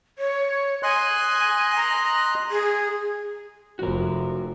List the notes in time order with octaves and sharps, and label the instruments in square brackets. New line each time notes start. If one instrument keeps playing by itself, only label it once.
[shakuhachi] C#5
[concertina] D#5 C6 F#6 [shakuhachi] G#5
[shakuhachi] A#5
G#4
[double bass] F1 F2 [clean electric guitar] F#4 A#4